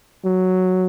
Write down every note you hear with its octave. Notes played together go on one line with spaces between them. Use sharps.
F#3